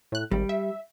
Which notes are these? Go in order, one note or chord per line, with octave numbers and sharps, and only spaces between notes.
A2 F#6
G#1 G3
E5